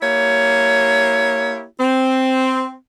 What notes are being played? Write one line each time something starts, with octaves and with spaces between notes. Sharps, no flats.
A#3 E4 G4 C#5
C4